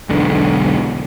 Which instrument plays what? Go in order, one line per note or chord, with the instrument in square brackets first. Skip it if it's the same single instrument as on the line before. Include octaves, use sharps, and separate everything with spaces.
[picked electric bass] E1 B1 E2 D3